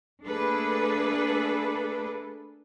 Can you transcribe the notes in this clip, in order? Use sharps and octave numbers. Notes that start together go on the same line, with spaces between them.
A3 A#3 D4 G#4 A4 B4